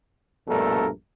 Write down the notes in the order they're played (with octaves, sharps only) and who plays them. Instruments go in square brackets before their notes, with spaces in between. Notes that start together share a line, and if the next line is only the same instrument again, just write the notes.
[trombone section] A#1 G2 B2 A3 A4 A#4